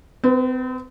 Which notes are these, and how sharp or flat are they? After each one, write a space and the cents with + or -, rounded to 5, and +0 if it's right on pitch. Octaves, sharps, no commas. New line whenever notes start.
C4 -40 B4 +0